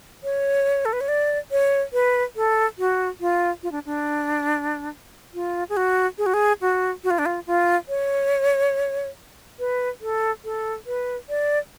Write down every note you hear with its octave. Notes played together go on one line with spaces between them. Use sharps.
C#5
A4
B4
C#5
D5
C#5
B4
A4
F#4
F4
F4
D4
D4
F4
G#4
F#4
G#4
F#4
G#4
F#4
F#4
F4
D4
F4
F4
C#5
B4
A4
A4
B4
D5